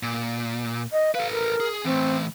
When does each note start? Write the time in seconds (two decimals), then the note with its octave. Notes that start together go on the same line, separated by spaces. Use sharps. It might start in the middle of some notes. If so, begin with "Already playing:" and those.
0.03 A#2
0.92 D#5
1.15 A4 B4 F5
1.32 A#4
1.60 G#4
1.85 E3 A3 C4